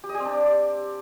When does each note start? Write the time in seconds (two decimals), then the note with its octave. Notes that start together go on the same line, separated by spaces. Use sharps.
0.04 G4
0.09 D#5
0.14 G4
0.20 C4
0.25 D4